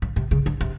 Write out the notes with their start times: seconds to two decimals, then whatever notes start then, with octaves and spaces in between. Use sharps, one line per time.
0.02 C#3
0.16 C3
0.31 C#3
0.46 D3
0.61 C3